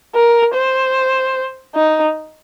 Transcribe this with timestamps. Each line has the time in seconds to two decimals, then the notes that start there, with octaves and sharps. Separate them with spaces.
0.15 A#4
0.55 C5
1.74 D#4